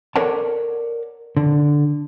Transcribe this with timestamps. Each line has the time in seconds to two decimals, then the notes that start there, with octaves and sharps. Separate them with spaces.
0.16 A4 A#4 C#5 D5 F#5 A5
1.37 D3